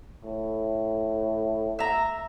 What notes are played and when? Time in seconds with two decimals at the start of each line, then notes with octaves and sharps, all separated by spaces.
0.24 A2
1.79 E5 A#5